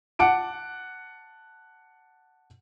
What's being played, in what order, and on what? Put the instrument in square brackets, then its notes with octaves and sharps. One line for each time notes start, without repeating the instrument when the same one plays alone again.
[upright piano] F#5 A5 D6 D7